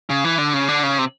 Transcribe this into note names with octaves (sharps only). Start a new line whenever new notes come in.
C#3
E3
D3
C#3
D3
C#3
C3